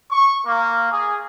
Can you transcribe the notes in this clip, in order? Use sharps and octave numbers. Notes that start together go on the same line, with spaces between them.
C#6
A#3
G#4